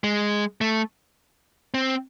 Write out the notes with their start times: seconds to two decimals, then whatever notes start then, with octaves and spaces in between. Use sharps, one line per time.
0.04 G#3
0.61 A3
1.74 C4